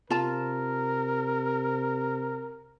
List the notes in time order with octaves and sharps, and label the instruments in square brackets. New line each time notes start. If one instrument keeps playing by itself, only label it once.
[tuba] C3 [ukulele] F4 A5 [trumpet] A#4